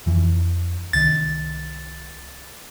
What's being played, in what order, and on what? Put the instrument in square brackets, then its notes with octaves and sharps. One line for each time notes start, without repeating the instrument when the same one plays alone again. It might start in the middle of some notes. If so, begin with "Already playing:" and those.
[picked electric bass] F2 E3
[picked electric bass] C2 D#3 [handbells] A6